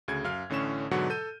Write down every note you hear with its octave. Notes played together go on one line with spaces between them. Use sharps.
D2 C#3 G#6
F#2 F5 F6
A1 A2 D3 C#4 C#6 E7
G#2 B2 D3 F#3 F#5 C#6
A4 G6 D#7